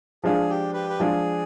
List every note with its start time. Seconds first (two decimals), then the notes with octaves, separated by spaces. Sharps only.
0.23 F3 G#3 D4 F4 G#4
0.50 G4
0.74 G4 B4
0.89 B4
1.00 F3 G#3 D4 F4 G#4